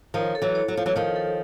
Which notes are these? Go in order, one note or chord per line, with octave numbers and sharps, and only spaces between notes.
D#3 F3 C#5
A4
E3 F#3
C#5
F#3
F3 C#5
E3 F#3
D#3 F3 C#5
A4